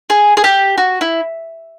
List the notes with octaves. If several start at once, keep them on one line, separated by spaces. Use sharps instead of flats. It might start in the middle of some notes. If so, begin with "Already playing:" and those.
G#4
G#4
G4
F#4
E4